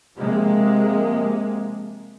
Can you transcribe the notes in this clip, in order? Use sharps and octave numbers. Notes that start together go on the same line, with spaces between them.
C3 F3 G#3 A#3